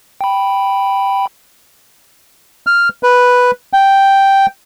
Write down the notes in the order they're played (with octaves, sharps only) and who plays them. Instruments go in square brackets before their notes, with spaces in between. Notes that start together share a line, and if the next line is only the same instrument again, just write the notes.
[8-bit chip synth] G5 B5
[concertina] F6
B4
G5